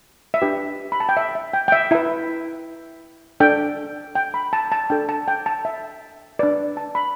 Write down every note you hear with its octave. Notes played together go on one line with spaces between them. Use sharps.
E5
D4 G4 B4 G5
B5
A5
G5
E5
E5
G5
G5
E5
E4 B4 E5
D4 A4 G5
G5
B5
A5
A5
D4 A4 G5
A5
G5
A5
E5
D4 B4 D5
A5
B5